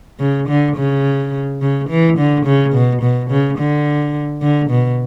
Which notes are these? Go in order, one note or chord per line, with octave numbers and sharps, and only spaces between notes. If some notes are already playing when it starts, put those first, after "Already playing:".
C#3
D3
C#3
C#3
E3
D3
C#3
B2
B2
C#3
D3
D3
B2